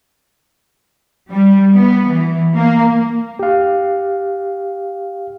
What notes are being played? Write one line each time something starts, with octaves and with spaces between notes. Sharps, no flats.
G3
B3
E3
A#3
G4 F5